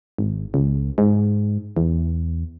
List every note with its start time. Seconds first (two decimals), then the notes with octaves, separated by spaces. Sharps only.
0.18 G#1
0.54 C#2
0.98 G#2
1.77 E2